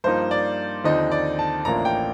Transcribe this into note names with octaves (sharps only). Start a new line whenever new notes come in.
G2 F3 A#3 D#4 C5
D5
D#2 D3 F3 C4 D#4 D#5
D5
A5
A1 A2 F3 A#3 D4 A#5
G5